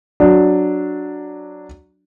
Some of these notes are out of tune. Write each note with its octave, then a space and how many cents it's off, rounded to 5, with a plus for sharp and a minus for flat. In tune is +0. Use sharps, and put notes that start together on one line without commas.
F#3 +0 D4 +0